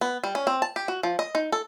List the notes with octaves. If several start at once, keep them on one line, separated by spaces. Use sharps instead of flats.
B3
G3
C#4
C4
A5
G4
F#4
F3
D#5
D#4
A4